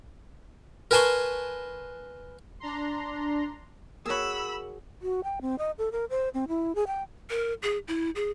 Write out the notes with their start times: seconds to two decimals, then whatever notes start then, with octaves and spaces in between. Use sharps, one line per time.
0.91 A#4 B4 G#5 A5 C6 C#6
2.60 D4 A#5 C6
4.06 A#3 F#4 G#4 C#5 B5 E6
5.02 F#4
5.24 G5
5.41 C4
5.59 D#5
5.78 A4
5.92 A#4
6.10 C5
6.34 C4
6.48 E4
6.75 G#4
6.87 G5
7.30 A#4
7.63 G#4
7.88 E4
8.16 G#4